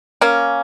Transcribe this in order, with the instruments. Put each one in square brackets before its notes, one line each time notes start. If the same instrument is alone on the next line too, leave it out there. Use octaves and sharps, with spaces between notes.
[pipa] A#3 C#4